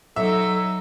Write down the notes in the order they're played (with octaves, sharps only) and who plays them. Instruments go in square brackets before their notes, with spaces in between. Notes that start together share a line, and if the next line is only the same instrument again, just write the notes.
[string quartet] F#3 D#4 [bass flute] A4 [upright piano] E5 [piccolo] E6